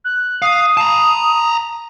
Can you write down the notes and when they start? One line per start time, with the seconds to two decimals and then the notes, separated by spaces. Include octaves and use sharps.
0.04 F#6
0.42 F5 D#6
0.77 A5 A#5